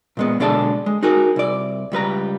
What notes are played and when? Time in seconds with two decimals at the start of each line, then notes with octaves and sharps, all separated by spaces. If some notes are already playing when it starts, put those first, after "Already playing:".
0.17 A#2 G#3 B3
0.40 B2 D3 G#3 D5 F5 A5
0.86 G#3
1.03 D#4 F#4 G#4 A#4
1.36 C2 D5
1.92 C#2 G3 B4 A#5